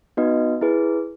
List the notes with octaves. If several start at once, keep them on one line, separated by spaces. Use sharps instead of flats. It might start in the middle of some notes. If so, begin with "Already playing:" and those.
B3 D#4 F#4 B4 D#5
E4 G#4 B4